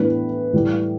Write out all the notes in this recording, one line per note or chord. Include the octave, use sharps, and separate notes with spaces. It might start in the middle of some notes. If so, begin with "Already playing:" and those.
Already playing: A2 E3 B3 D4 B4
A2 E3 G3